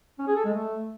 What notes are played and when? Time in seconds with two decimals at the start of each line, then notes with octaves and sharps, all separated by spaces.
0.19 C#4
0.27 G#4
0.36 A4
0.45 G#3
0.53 A3